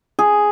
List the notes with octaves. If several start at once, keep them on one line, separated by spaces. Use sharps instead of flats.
G#4